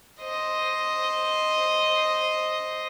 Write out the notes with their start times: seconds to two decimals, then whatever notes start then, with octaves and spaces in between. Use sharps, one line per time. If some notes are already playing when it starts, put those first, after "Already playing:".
0.21 C5 D#5